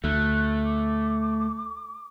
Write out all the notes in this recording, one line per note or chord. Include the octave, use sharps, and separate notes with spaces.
D2 A3 F#6
D6